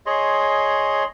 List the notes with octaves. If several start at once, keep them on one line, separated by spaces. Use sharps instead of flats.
G#4 C#5 D#5 C6